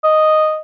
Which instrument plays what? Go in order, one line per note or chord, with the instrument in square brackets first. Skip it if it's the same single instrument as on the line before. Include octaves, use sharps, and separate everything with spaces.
[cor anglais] D#5